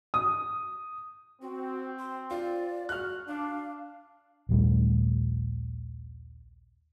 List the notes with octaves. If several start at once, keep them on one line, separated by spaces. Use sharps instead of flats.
D#6
C4 F#4
C6
F4 D5
F#4 F6 F#6
D4 F5
A#1 D#2 G3 A3